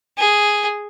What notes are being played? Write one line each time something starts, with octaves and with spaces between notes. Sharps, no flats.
G#4